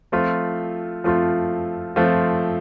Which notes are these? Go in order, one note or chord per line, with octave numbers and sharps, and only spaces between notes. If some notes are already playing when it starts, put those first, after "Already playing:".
F3 A3 C4 F4
F3 A3 C4 F4
F3 A3 C4 F4